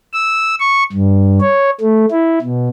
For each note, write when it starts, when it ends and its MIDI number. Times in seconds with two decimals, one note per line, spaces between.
0.13 0.55 88
0.60 0.83 85
0.92 1.39 43
1.41 1.70 73
1.81 2.06 57
2.11 2.39 64
2.42 2.68 47